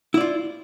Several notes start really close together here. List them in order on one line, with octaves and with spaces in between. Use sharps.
E4 D5 F4